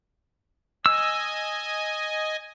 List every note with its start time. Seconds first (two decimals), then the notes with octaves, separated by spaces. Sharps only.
0.86 D#5 G#5 E6